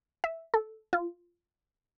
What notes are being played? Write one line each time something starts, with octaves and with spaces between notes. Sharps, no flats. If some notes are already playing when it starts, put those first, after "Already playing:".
E5
A4
F4